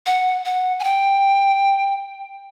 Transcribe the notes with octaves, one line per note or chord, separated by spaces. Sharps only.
F#5
F#5
G#5
G5